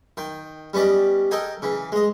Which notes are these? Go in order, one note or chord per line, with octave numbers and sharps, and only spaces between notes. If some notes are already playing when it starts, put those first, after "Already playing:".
D#3 G5
G3 B3 C#4 D5 D#5
A4 A#4 D#5 G5 G#5
C#3 E3
G#3 D#5